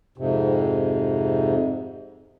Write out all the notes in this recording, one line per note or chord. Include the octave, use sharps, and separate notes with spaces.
F2 G#2 C3